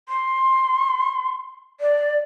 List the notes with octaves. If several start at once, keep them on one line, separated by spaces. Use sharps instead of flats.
C6
D5